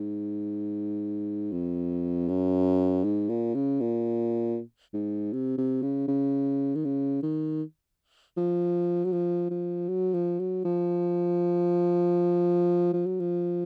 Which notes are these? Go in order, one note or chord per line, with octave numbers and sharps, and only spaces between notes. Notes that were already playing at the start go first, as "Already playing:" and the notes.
Already playing: G#2
F2
F#2
G#2
A#2
C#3
A#2
G#2
C3
C3
C#3
C#3
D#3
C#3
D#3
F3
F#3
F3
F3
F#3
F3
F#3
F3
F3
F#3
F3